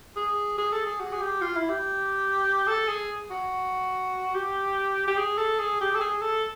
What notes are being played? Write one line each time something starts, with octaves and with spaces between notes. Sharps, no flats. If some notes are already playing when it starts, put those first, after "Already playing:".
G#4
G#4
A4
G#4
F#4
G#4
G4
F4
E4
G4
A4
G#4
F#4
G4
G4
G#4
A4
G#4
G4
A4
G#4
A4